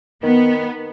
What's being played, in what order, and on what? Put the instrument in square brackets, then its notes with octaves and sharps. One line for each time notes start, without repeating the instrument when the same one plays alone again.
[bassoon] D#3 [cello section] B3